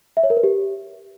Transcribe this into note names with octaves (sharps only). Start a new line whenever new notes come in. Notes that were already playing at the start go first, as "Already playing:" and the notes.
E5
C#5
A#4
B4
G4